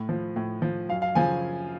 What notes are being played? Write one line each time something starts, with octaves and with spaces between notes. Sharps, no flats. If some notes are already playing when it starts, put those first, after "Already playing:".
Already playing: A2
F3
A2
F3
F#2 F5
F5
C#3 F3 G#5